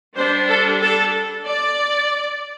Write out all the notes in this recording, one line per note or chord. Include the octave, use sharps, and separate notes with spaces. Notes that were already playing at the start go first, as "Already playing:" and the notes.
G3 D4 C5
A4
A4
D5